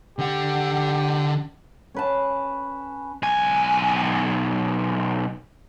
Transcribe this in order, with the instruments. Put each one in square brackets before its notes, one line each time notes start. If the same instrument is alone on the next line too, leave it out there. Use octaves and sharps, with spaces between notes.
[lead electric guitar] D3 F#5 [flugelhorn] G4
[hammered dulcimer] C#4 B4 A5
[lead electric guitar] B1 G#5